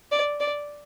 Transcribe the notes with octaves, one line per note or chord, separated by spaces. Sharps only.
D5
D5